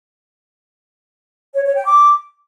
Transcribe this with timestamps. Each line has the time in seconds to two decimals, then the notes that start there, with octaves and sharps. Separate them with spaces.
1.54 C#5
1.64 C#5
1.75 G5
1.85 D6